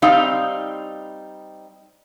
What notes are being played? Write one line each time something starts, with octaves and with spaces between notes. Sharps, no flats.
G3 C4 D#4 F5